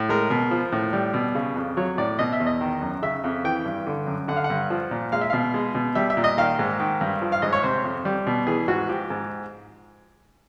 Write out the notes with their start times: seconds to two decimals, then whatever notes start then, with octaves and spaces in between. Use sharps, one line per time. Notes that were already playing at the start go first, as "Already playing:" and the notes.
Already playing: A2
0.09 G#3 A#4
0.30 B2
0.51 F3
0.72 A2
0.93 G3
1.14 B2
1.35 C#3
1.56 F2
1.77 F#3 C#5
1.98 A2 D5
2.19 B2 D#5
2.33 E5
2.40 E2
2.46 D#5
2.61 D#3
2.81 F#2
3.02 C#3 E5
3.24 F2
3.44 E3 G5
3.65 G2
3.86 D3
4.07 F#2
4.28 D3 F#5
4.36 F5
4.44 F#5
4.50 G2
4.70 F3
4.91 A#2
5.12 G#3 F5
5.21 E5
5.30 B2 F5
5.54 G#3
5.75 B2
5.95 G3 E5
6.10 E5
6.17 A#2
6.24 D#5
6.38 D#3 F5
6.59 G#2
6.80 D#3
7.01 G2
7.22 F3
7.32 F5
7.42 G#2 D#5
7.53 C#5
7.63 C3 C5
7.84 F2
8.05 G3
8.27 B2
8.47 E3 G#4
8.68 G#2 F#4
8.89 F3 G4
9.10 G#2